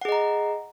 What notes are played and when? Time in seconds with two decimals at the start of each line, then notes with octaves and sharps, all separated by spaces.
0.01 F#5
0.05 G#4
0.09 D#5
0.12 A#5